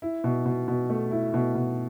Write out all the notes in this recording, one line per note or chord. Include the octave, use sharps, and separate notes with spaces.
E4
B2
B2
B2
A3
E4
B2
B2